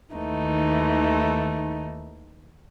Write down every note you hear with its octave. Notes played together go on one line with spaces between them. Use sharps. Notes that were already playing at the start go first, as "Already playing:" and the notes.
D#2 D#3 E3 A3 D#4